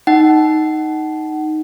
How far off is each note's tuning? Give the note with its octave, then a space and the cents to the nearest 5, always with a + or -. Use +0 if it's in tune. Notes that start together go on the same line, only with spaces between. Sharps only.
D#4 +0 F#5 +20